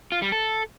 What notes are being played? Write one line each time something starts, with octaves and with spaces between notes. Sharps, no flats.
F4
G3
A4